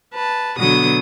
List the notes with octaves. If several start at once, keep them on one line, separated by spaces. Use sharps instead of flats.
B4 A5
B2 D3 F#3 B3 D#6